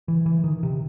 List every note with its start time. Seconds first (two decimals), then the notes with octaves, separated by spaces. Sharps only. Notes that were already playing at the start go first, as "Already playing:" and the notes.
0.08 E3
0.26 E3
0.44 D#3
0.63 C3